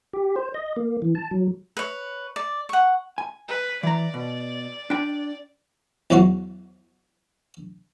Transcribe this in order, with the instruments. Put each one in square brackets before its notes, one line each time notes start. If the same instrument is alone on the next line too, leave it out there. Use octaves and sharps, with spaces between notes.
[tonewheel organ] G4
C5
D#5
A#3
E3
A5
F#3
[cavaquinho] B4 C#5
D5
F#5 C#6
[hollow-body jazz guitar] G#5
[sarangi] B4
[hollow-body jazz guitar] E3 A#5 [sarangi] D5
[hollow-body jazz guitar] B2
D4 G5
[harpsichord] E2 G#2 F#3 F#4 F5 F#5